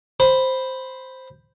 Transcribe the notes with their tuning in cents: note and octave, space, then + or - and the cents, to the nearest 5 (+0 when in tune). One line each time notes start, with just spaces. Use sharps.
C5 +0 B5 +0